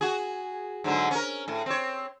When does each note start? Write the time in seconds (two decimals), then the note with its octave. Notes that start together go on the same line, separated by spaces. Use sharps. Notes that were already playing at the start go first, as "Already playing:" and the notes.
0.01 F#4 G#4
0.84 G#2 D3 F#3
1.11 C#4 A#4
1.48 A2
1.66 C4 C#5